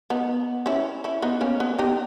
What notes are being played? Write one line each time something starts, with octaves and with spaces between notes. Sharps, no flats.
B3 D#4
C#4 E4
C#4 E4
B3 D#4
A#3 C#4
B3
D#4 G4